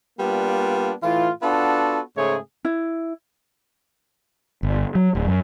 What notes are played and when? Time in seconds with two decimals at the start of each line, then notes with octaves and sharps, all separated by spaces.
0.19 G3 A#3 B3 D4 F4
1.03 A2 E3 F4
1.42 B3 D4 F4 F#4 A4
2.16 G#2 C#3 A3 G#4 C#5
2.65 E4
4.63 G1
4.95 F#3
5.15 D1
5.27 F#2